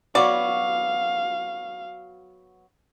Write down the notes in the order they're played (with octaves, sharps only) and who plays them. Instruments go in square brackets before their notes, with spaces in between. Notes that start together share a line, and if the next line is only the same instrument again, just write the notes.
[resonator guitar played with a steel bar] F#3 B3 F#4 [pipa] D5 [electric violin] F5